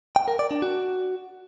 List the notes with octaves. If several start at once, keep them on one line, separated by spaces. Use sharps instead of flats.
G5
A#4
D5
D4
F#4